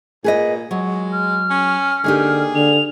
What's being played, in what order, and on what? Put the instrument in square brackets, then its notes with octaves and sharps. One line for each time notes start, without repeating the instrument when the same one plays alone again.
[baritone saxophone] A#2 [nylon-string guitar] G#4 B4 D#5
[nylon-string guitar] F#3 [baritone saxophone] G#3
[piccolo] F6
[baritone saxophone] C#4
[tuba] D3 [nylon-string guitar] A#3 D#4 G4 [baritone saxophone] G#4
[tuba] D3 [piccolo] F7